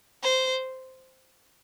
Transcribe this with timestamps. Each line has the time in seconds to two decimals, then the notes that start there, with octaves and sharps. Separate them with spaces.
0.23 C5